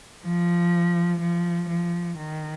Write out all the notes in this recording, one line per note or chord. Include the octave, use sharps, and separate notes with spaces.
F3
F3
F3
D#3